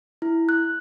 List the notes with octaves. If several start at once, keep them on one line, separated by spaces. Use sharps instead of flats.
E4
F#6